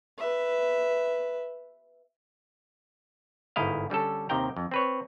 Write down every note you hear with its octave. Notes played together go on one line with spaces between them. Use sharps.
B4 E5
G1 G#2 E4 D#5 F5
D3 G3 C#4 A4
D#2 C3 D#3 F5 G5 A#5
F2
C4 B4 C#5